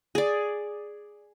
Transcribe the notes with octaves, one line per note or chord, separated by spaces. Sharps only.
G#4 D5